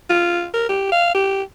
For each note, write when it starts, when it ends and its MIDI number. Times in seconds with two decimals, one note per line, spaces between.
0.10 0.47 65
0.54 0.65 70
0.69 0.88 67
0.92 1.14 77
1.15 1.42 67